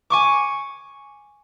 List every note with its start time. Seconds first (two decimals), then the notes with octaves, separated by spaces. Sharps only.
0.10 G#5 C#6 D6